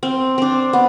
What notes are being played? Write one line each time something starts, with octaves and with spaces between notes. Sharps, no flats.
C4
C4 D4
B3